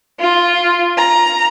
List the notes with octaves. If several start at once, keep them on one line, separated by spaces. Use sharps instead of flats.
F4
A#5